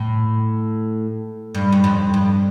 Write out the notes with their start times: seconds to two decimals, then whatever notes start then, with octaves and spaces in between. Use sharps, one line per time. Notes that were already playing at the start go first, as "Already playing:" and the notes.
Already playing: A2
1.54 G2
1.72 G2
1.84 F2
2.14 G2